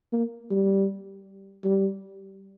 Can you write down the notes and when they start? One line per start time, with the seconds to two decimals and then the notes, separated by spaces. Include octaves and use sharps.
0.12 A#3
0.51 G3
1.64 G3